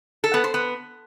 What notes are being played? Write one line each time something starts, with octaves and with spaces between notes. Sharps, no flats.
A4
B3
C5
B3